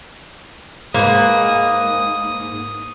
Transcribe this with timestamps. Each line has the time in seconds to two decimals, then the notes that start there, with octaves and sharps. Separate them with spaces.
0.94 G#2 A#3 B4 D#6